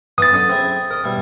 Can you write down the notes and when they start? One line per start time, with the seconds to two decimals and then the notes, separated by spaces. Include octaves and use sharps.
0.18 E3 B3 D#6 A6
0.31 F#2 D3 D#5
0.49 C4 E4 G#4
0.91 A#4 D#5
1.04 B2 G3 E4